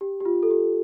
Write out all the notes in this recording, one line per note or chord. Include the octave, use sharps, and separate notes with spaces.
G4
G4
F4
A4
G4